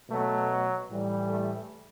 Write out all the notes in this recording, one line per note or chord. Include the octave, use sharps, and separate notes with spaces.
B2 F#3 A3
A2 E3 G3
A3